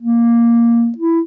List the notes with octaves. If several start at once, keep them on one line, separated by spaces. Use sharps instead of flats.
A#3
E4